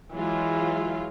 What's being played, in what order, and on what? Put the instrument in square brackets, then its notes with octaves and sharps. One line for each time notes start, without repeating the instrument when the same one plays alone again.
[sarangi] E3 [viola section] F#3 G#3 F4